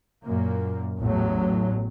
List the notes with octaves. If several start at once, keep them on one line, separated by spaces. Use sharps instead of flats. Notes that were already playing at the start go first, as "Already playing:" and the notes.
F#2 A#2 A#3
A1 E2 A2 F#3